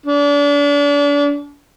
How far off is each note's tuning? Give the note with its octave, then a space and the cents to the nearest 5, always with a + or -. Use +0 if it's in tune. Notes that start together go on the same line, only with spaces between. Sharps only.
D4 -35